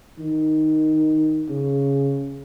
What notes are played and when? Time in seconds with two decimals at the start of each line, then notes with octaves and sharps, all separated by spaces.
0.19 D#3
1.49 C#3